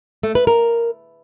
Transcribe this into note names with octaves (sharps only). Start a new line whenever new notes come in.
A3
B4
A#4